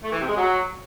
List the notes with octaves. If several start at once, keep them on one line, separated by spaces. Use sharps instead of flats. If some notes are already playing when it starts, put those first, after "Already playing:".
A3
E3
C3
G#3
F#3